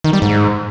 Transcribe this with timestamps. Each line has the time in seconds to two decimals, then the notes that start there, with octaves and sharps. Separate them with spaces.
0.04 D#3
0.13 G3
0.22 G#2